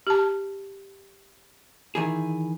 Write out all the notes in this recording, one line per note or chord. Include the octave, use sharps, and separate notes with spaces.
G4 A5
D#3 E3 G#4